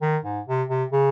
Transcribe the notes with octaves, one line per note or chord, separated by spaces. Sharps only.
D#3
G#2
C3
C3
C#3